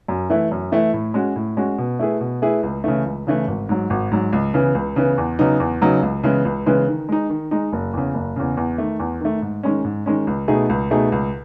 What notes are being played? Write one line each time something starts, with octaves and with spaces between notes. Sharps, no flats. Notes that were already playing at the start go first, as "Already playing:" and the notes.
F#2
E3 A3 E4
F#2
E3 A3 E4
A2
G#3 C#4 F#4
A2
G#3 C#4 F#4
B2
A3 E4 G#4 B4
B2
A3 E4 G#4 B4
C#2
C#3 E3 A3
C#2
C#3 E3 A3
G#1
G#2 F#3
G#1
G#2 F#3
C#2
C#3 E3 B3
C#2
C#3 E3 B3
E2
C#3 F#3 B3 D#4
E2
C#3 F#3 B3 D#4
C#2
C#3 E3 G#3 B3
C#2
C#3 E3 G#3 B3
D#3
G#3 D#4
D#3
G#3 D#4
F#1
E2 C#3
F#1
E2 C#3
E2
D#3 A3
E2
D#3 A3
G#2
D#3 G#3 C#4
G#2
D#3 G#3 C#4
C#2
B2 A3 D#4 G#4
C#2
B2 A3 D#4 G#4
C#2